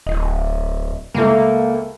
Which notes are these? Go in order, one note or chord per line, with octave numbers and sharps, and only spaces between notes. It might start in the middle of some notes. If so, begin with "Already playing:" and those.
D1 D#5
C#2 A3 A#3